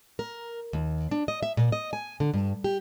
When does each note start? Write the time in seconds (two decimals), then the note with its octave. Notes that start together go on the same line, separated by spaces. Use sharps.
0.19 A#4
0.73 D#2
1.11 D4
1.28 D#5
1.43 E5
1.57 A#2
1.72 D#5
1.93 G#5
2.20 D3
2.34 G2
2.64 G4